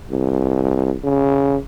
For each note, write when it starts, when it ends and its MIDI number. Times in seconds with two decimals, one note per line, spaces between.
0.11 0.94 36
1.04 1.57 49